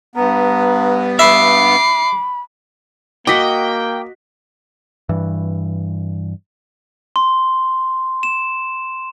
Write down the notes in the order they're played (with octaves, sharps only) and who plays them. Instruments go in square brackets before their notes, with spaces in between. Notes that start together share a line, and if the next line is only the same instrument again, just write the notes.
[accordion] G2 B3 [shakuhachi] A#5
[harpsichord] E5 [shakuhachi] B5 [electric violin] D6 C7
[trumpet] A#3 [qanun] F#4 D#5 [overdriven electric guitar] G5 [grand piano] D6 B6
[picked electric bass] G2 E3
[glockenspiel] C6
E7